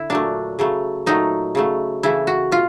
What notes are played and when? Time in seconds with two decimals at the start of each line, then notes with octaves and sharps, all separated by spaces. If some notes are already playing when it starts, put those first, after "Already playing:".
Already playing: D3 E4
0.10 A#2 F#3 A3 D4
0.59 C#3 F#3 A3
1.06 A#2 F#3 A3 D#4
1.55 C#3 F#3 A3
2.03 C#3 E3 A3 E4
2.27 F#4
2.52 B2 F4